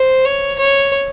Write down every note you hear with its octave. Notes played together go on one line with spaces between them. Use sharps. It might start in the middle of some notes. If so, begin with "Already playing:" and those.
Already playing: C5
C#5
C#5